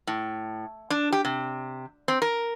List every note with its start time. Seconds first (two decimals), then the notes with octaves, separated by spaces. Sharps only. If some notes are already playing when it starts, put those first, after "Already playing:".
0.07 A2
0.90 D4
1.13 G4
1.25 C3
2.08 C4
2.22 A#4